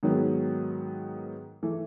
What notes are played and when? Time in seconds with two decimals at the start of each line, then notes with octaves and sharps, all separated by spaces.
0.03 G#2 D#3 F#3 B3
1.63 E3 A3